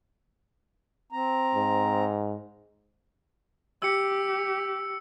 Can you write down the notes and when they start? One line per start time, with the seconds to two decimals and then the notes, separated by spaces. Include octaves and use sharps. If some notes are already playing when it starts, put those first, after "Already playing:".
1.12 C4 A#5
1.54 G#2
3.82 G4 E6 C#7